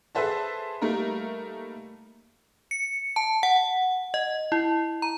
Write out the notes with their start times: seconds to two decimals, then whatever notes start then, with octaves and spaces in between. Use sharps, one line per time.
0.15 G#4 A4 B4 C5 E5 A5
0.82 G3 A3 A#3 D#4 A#4
2.71 C#7
3.16 A5
3.43 F#5
4.14 D#5
4.52 E4
5.02 A#5